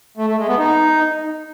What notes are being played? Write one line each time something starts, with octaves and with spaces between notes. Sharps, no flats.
A3
A3
G#3
B3
D#4